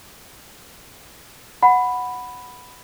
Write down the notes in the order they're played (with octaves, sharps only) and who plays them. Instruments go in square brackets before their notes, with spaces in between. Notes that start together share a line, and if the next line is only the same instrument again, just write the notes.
[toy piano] F#5 [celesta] B5